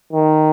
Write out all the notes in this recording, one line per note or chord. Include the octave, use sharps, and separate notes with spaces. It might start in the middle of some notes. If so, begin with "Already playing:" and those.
D#3